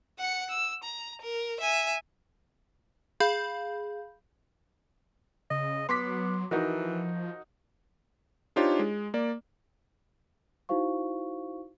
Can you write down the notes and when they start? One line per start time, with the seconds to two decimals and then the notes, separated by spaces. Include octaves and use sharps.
0.19 F#5 C#7
0.50 E6
0.84 A#5
1.22 A#4
1.61 E5 G#5
3.20 G#4 F5 B5 G6
5.51 C#3 D#5
5.89 F#3 B3 C6 D6 B6
6.51 E3 F3 D#4 F#4 A#4
8.56 D4 D#4 F4 G4 C5 C#5
8.79 G#3
9.14 A#3 D5
10.69 D#4 E4 F#4 C5 F5 C#6